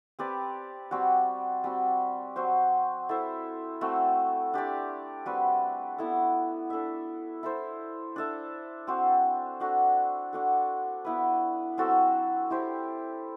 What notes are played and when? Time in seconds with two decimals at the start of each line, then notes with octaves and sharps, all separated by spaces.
0.19 C4 G4 B4 D5
0.91 G3 C4 F#4
1.64 G3 C4 F#4
2.36 F#3 C4 F#4 C5
3.09 E4 A4 C5 E5
3.81 A3 C4 F#4
4.54 D4 G4 D5
5.26 G3 C4 F#4 B4
5.98 B3 E4 A4
6.70 D4 A4 E5
7.43 E4 A4 C5
8.16 D4 A4 E5
8.87 C4 F#4 C5
9.60 D4 F#4 A4
10.33 D4 F#4 A4
11.05 B3 E4 B4
11.77 F#3 C4 F#4 A4
12.50 E4 G4 C5